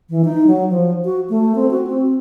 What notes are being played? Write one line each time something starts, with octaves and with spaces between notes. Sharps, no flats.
E3
D#4
F#3
F3
F#4
A3
C4
F#4
C4